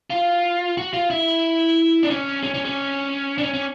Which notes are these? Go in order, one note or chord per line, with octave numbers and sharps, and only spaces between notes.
F4
F#4
F4
E4
D4
C#4
C#4
C#4
C#4
D4
C#4
C#4